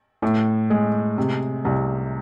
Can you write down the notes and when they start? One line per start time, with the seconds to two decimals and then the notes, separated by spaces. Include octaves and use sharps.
0.22 A2
0.70 G#3
1.18 C3
1.65 C2